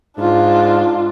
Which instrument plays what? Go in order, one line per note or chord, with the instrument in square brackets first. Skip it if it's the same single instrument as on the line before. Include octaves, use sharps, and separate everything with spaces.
[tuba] G#2 [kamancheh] D4 F4